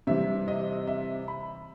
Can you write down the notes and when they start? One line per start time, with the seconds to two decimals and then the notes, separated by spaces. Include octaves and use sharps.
0.07 C3 E3 G3 E5
0.48 D#5
0.87 E5
1.28 B5